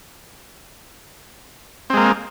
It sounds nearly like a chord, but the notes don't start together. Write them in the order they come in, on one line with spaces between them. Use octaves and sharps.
C4 G#3 A#3